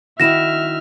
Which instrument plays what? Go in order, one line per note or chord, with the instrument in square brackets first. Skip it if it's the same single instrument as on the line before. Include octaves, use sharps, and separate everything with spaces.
[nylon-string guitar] D#3 E4 F#4 [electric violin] E5 F6 [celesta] A#6 E7